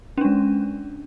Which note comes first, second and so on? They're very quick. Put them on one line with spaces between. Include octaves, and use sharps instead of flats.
C#4 D4 G#3